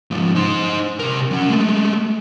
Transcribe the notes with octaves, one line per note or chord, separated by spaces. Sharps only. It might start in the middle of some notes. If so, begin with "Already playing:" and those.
G#2 F3
D#4 C5
C3 A#4
F#3 C#4
G#3 A3